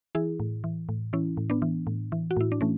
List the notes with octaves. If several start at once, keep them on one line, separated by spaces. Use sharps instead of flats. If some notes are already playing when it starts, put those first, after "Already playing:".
E3 E4 G#4
A2
E3
A2
E3 C#4 E4
A2
B3 D4
E3
A2
E3
F#4
A2 E4
D4
E3 A3 C#4